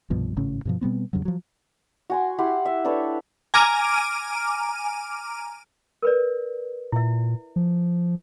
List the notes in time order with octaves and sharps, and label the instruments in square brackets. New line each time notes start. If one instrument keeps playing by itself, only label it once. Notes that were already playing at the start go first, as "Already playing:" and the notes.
[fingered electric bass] C2 G2 B2 F3
G#1 A2 C#3 C#4
G2 B2 F3
B2 G3 B3 C4
E2 G2 C#3 F#3
F3 F#3
[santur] F#4 G#5 C6
E4 G4 F#5 C6
E5
D4 A4 B4 C#5
[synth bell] G#5 A#5 D6 F6 D7 D#7
[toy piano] A#4 B4 D5
[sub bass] A#2 [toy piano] E4 E5
[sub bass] F3